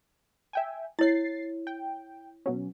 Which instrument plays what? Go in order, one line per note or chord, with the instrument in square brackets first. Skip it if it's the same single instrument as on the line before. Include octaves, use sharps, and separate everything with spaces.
[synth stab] E5 G5 G#5
[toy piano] E4 C#5 [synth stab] A6 C7
[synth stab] G5
B2 F#3 C#4